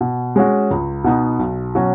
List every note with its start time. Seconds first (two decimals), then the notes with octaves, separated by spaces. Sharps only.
0.01 B2
0.36 G#3 C#4 F#4
0.71 C#2
1.04 B2 B3 D#4
1.39 B1
1.75 B2 F#3 C#4 F#4